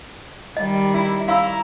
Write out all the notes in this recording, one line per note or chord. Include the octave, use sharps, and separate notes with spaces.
D#3 G3 D#5
E4
E4 F5 A#5 C#6 E6